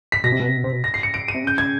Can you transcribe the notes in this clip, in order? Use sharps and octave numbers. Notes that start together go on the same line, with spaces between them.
B6
B2 A#6
C3
B2
C3
B2
C3
B2
A#6
C7
C#7
D7
D#7
C3
C#3 G6
G#6